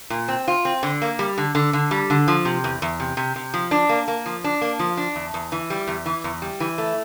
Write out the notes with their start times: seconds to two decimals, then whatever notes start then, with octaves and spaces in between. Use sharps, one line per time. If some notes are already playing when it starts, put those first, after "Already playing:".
0.10 A#2
0.28 C4
0.48 F4
0.65 C4
0.83 D3
1.02 A#3
1.19 G3
1.38 D3
1.55 D3
1.73 D3
1.91 G3
2.10 D3
2.28 F3
2.45 C3
2.64 E2
2.82 E2
3.00 C3
3.17 C3
3.36 C3
3.54 F3
3.71 D4
3.89 A#3
4.08 A#3
4.26 F3
4.44 D4
4.61 A#3
4.79 F3
4.97 D4
5.16 E2
5.34 E2
5.52 E3
5.70 G3
5.88 E2
6.06 E3
6.24 E2
6.42 G3
6.60 E3
6.78 A3